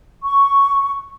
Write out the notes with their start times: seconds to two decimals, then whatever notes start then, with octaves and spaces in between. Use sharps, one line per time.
0.22 C#6